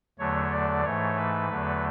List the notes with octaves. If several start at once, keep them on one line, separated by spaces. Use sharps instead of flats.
E2 D3 F#3 A3 C#5
D5
G#2 E3 A3 C#5
B4
E2 D3 F#3 A3